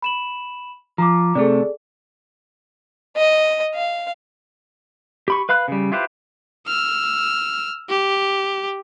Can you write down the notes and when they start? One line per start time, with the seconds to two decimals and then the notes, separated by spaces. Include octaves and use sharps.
0.02 B5 E7 F#7
0.98 F3 A#5 D6
1.35 C3 A3 G#4 A4 D5
3.17 D#5
3.75 F5
5.28 G4 B5 C#6
5.49 B4 F5 B5 F#6
5.68 C#3 G3
5.92 E4 F4 G4 B4 C5
6.68 E6 F6
7.89 G4